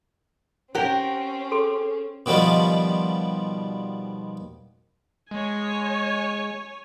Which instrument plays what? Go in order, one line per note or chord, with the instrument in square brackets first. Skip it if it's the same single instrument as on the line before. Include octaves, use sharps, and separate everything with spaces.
[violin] C4 C#4 [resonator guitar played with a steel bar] G4 A#4 [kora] F#5 G5
[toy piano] G#4 A4 C6
[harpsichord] B2 D#3 F3 G3
[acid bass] G#3 [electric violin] C#5 G#5